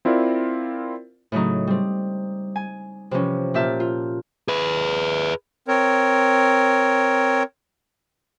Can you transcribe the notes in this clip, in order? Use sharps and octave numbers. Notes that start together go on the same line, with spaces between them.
C4 E4 F4 A#4 D5
A2 C#3 F#3 D#4
G3 C4
G#5
C3 E3 F3 C#4
A#2 G4 E5 A5 F6
F4
G#4 B4
C4 A#4 C#5